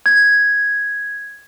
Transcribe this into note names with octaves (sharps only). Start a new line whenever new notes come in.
G#6